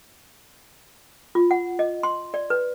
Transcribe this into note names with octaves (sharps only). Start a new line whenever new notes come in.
F4
F#5
D#5
C6
D5
B4